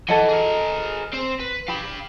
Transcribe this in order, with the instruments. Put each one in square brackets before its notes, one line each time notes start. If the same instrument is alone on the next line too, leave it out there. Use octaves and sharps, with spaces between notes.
[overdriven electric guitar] E3 [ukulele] A4 D#5 F#5
[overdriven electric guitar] G#4 A#4
C4 C5
B4
[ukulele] G4 [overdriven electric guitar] F5 B5